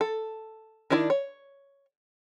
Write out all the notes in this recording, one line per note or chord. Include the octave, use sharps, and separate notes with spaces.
A4
D#3 D4 E4 D5
C#5